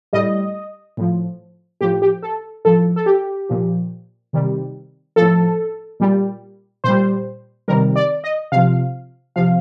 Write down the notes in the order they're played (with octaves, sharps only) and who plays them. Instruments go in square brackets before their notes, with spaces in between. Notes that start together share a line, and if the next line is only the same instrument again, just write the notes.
[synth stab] A2 G3 D#5
A2 F3
A2 F3 G4
G4
A4
A2 F3 A4
A4
G4
A#2 F3
C3 D#3 G3
A2 F3 A4
A#2 G3
A#2 G3 C5
C3 D#3 G3 A#4
D5
D#5
C3 F3 F5
C3 F3 F5